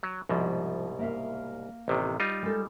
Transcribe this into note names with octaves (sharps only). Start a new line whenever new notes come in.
F#3
C2 G#2 B2 F3
A#3 E5 F5
A1 C3 D#3
G3 D#4 F4
G#3 A4